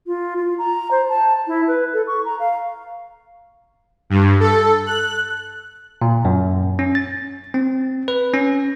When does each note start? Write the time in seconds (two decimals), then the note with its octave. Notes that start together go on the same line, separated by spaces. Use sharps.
0.07 F4
0.37 F4
0.58 A#5
0.91 C5
1.09 A5
1.47 E4
1.68 B4
1.94 A4
2.07 C#6
2.25 A#5
2.40 F5
4.10 G2
4.40 A4
4.86 F#6
6.02 A#2
6.25 F#2
6.79 C#4
6.95 A6
7.54 C4
8.08 B4
8.34 C#4